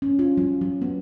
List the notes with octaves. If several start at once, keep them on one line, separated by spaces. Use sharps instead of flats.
C#4
F4
F#3
F#3
B3